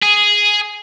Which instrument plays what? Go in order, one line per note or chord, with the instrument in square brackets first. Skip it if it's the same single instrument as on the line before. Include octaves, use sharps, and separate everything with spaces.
[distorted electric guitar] G#4